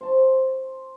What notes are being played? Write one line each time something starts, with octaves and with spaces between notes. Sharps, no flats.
C5 A5 C#6